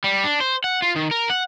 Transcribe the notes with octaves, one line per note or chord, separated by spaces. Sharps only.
G3
D4
C5
F#5
F4
D#3
A#4
F#5